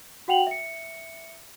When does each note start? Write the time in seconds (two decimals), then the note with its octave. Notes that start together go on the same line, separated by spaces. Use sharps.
0.28 F#4 F#5 G5 F7 F#7
0.47 E5 C#7